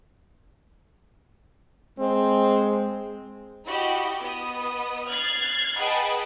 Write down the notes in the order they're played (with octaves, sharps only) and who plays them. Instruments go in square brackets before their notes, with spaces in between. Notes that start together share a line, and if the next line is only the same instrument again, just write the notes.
[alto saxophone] G#3 [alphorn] C4
[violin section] E4 F#4 G4 D#5
B3 D#5 D#6
F6 F#6 G#6 A6 C7
G#4 B4 D#5 F#5 G5 A5